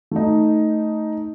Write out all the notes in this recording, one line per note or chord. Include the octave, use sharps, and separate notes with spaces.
A3 D#4